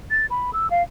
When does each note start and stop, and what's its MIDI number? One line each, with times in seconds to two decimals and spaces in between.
0.11 0.26 93
0.30 0.51 83
0.53 0.70 88
0.70 0.82 77